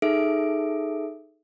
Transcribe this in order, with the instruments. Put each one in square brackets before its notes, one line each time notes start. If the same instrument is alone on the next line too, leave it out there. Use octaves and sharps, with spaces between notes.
[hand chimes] D#4 G#4 A4 E5 D7